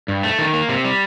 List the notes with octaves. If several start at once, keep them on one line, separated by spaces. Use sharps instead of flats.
G2
A3
D#3
A#3
C3
G3